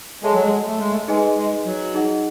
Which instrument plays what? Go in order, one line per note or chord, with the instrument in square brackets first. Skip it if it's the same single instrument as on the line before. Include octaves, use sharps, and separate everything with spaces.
[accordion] G#3 [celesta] A4 C#5 E5 A5 C#6
[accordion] F#3
G#3
A3
G#3
A3
[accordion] G#3 [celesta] D#4 G#4 B4 D#5 G#5
[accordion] G#3
F#3
[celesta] D#4 G#4 D#5 F#5